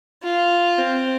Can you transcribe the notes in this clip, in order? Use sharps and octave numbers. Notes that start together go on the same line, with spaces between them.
F4
C4